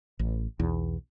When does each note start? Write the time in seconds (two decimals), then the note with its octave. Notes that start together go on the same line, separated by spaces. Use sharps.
0.19 A1
0.60 B1 E2